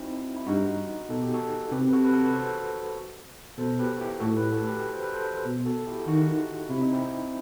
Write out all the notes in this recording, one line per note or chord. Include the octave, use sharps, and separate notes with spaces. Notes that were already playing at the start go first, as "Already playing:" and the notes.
Already playing: C4 D#4 E4 F#4
E4
G2 D#4 F#4
B2 A4
G4
F#4 A4
C3 G4 B4
B4
F#4 A4
B4
F#4 A4
B4
A4 C5
B2 A4 C5
G4 B4
F#4
E4 G4
A2 F#4 A4
G4 B4
F#4 A4
G4 B4
C5
B4
A4 C5
B2
F#4 A4
E4 G4
D#3 D#4 F#4
C3 E4
D#4
C4 E4